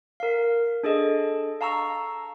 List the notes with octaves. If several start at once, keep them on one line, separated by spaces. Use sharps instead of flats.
A#4 F5
D4 G#4 A4 D#5
F5 A5 A#5 C#6 E6